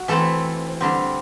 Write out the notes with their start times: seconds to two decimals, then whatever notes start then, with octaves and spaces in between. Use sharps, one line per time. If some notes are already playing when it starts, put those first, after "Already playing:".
Already playing: F#4
0.08 E3 A3 C4 E4 A4
0.81 D3 G3 C4